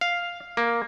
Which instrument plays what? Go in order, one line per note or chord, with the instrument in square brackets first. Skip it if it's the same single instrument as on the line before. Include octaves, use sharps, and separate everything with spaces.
[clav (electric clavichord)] F5
A#3